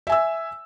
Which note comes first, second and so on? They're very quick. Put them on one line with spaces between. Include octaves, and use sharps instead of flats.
E5 G#5 E6